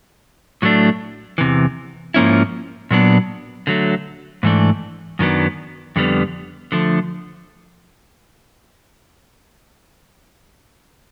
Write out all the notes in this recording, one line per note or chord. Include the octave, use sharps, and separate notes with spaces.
A2 F#3 A3 D4
E2 C3 E3
G#2 F3 A#3 C#4 E4
A#2 F#3 B3 D4
D3 F#3 A3
G#2 E3 A3 D4
F#2 D#3 F#3 B3 D4
F2 D3 G3 B3
D3 F3 A3